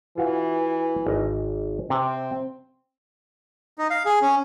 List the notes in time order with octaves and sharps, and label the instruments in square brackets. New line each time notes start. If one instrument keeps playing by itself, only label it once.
[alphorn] E3 [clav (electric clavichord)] F4 F#4 F5
[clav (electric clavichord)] G#1 D#5
[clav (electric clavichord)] C3 [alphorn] C4
[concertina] D#4
F5
G#4
C#4